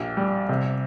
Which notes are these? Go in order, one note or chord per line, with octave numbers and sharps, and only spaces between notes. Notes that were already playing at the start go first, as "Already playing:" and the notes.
Already playing: A#1 G4
G3
C3